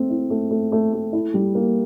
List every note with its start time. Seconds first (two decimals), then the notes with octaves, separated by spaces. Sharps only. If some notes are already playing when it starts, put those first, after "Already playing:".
Already playing: A3 C4
0.10 E4
0.30 A3
0.51 A3
0.72 A3
0.93 A3
1.13 E4
1.34 G3
1.55 A#3